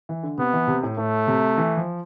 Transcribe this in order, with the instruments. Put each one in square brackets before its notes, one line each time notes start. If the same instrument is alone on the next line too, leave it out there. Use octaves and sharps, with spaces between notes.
[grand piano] E3
D3
[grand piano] C3 [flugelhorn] B3
[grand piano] E3
C3
A2
[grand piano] A2 [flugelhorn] A3
[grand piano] C3
E3
F3